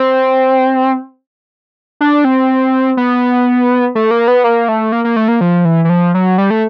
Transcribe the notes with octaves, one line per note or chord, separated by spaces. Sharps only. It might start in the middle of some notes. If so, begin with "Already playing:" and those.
Already playing: C4
D4
C4
B3
A3
A#3
B3
A#3
A3
A#3
A#3
A3
A#3
F3
E3
E3
F3
F#3
G3
A3